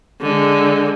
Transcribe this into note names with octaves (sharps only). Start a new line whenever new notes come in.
D3 G#3